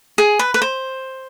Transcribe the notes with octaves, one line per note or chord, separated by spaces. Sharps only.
G#4
B4
B4
C5